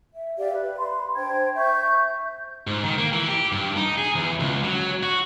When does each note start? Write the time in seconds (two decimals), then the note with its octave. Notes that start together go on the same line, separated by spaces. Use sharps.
0.15 E5
0.38 G4 D5 E5 F5
0.52 B4
0.76 B5 C6
1.16 D4 C5 G5 G#6
1.56 E5 C#6 G6
2.67 G#2
2.83 D#3
2.98 A#3
3.13 E3
3.28 G4
3.52 G2
3.76 D#4
3.98 G#4
4.15 E2
4.40 C#2
4.64 F#3
5.03 F#4